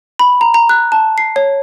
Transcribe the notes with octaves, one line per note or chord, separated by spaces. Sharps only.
B5
A#5
A#5
F#6
A5
C7
C#5